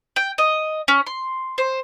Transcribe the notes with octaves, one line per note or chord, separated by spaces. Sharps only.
G5
D#5
C#4
C6
C5